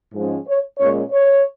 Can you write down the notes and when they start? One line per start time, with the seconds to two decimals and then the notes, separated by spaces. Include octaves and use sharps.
0.13 G#2 F3 G#3 C#4
0.46 C#5
0.78 A#2 G#3 C#4 C#5
1.11 C#5